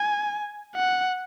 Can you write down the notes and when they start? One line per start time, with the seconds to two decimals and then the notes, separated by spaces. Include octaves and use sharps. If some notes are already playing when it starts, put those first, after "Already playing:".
Already playing: G#5
0.75 F#5